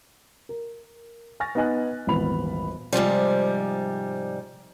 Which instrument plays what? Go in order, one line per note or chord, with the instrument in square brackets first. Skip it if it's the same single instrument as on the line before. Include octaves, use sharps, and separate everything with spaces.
[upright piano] A#4
G#5 C#6 F6 A6 A#6
B3 D#4 D#5 G#5 F#6
D#1 G#1 E3 B3 B5 F7
[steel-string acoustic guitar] G#2 C3 F3 G3